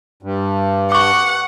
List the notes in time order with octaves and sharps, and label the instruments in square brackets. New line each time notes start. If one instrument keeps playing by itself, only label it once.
[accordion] G2
[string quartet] F#5 [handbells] C#6 D6